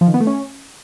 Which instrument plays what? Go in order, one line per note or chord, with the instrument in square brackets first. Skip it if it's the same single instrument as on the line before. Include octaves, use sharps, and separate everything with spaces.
[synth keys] F3
D#3
B3
A3
C#4